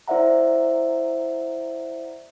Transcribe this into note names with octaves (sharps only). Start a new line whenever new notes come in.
E4 C5 D5 E5 F#5 A#5